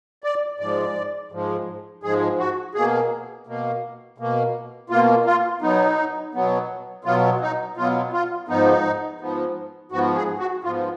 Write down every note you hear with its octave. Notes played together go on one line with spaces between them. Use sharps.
D5
G#2 F3 G#3 D5
G#2 F3 G#3
G#2 F3 G#3 G#4
F#4
B2 A#3 G#4
B2 A#3
B2 A#3
B2 A#3 F4
F4
B2 F#3 B3 D#4
B2 F#3 B3
B2 F#3 B3 F4
D#4
B2 F#3 B3 F4
F4
G#2 F3 B3 D#4
G#2 F3 B3
G#2 F3 B3 F#4
G#4
F#4
G#2 F3 B3 F4